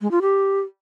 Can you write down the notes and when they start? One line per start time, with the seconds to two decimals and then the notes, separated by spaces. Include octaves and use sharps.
0.01 G#3
0.11 F4
0.22 G4